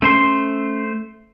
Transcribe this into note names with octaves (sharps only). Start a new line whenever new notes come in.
A3 C#4 C5 C6